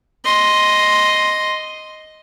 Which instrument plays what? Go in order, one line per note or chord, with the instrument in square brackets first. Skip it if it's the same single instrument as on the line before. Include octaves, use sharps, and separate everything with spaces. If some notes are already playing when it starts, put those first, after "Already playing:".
[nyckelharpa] D#5 C6